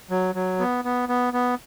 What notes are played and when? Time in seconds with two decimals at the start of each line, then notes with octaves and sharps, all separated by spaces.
0.11 F#3
0.35 F#3
0.60 B3
0.85 B3
1.09 B3
1.33 B3